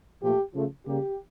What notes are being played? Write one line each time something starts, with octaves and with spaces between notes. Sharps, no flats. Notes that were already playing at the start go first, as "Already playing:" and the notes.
A#2 F3 A3 G4
C#3 F3 A3
C#3 G3 A#3 G4